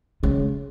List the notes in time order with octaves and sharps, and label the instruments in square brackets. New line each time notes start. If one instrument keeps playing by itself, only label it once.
[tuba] C#3 [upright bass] G#3